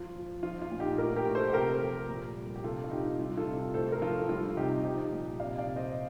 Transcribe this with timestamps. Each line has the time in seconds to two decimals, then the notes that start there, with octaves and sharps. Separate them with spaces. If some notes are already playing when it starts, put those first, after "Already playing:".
Already playing: F3 F4
0.16 F3
0.43 F3 F4
0.62 F4
0.71 A#2
0.80 D#4 G4
0.98 A2 G4 A#4
1.16 G4 A#4
1.26 A2
1.35 A4 C5
1.53 C3 G4 A#4
1.80 F3
2.09 A#2
2.36 G3
2.56 G4
2.64 C3 F4 A4
2.84 F4
2.91 C3 D#4 G4
3.19 G3 F4
3.37 F4 A4
3.47 C3
3.74 A2 A4 C5
3.92 A#4
4.02 F3 F4 A4
4.29 G3 F4
4.57 C3 D#4 G4
4.84 F3 D#4 G4
5.12 A#2
5.40 C3 D5 F5
5.58 D5 F5
5.67 C3
5.76 C5 D#5